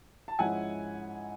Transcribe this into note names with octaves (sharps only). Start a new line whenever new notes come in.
A5
G#2 F3 G#3 C#4 E4 F#5 G#5